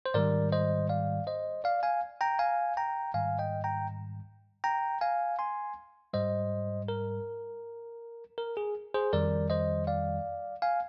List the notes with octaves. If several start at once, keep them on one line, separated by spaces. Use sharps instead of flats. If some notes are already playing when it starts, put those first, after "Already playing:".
C5
G#2 D#3 G3 A#4 D5
C5 D#5
D5 F5
C5 D#5
D5 F5
F5 G#5
G5 A#5
F5 G#5
G5 A#5
G#2 D#3 G3 F5 G#5
D#5 G5
G5 A#5
G5 A#5
F5 G#5
G#5 C6
G#2 G3 C5 D#5
A#4
A#4
G#4
G#4 C5
F2 D#3 G3 A#4 D5
C5 D#5
D5 F5
F5 G#5